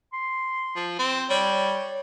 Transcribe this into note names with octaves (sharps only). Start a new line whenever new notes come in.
C6
F3
C4
G3 C#5